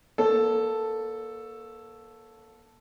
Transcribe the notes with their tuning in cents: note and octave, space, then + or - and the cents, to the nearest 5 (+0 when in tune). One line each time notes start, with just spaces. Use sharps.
A#3 +30 A4 +0 C#5 +0